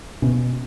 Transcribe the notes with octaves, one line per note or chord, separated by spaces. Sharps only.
B2 C#4